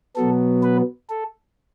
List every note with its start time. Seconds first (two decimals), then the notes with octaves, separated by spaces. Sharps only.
0.16 B2 F#3 B3 A4
0.63 B4
1.10 A4